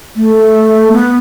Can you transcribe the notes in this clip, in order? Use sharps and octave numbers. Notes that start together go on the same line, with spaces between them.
A3
B3